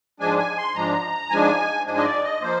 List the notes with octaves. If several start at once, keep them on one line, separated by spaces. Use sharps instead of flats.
G#2 F3 G#3 D4 G#5
G#5
C6
G#2 F3 G#3 D4 A#5
G#2 F3 G#3 D4 G#5
G#2 F3 G#3 D4 G#5
D#5
D5
D#5
F3 A#3 C5